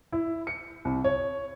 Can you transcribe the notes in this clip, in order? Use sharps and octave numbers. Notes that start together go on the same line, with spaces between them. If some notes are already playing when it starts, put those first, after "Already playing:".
E4
C#7
C2
C#5